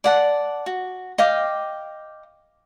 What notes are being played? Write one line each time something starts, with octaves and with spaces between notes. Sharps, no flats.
D5 F#5 A5
F#4
D#5 F5 G5 D6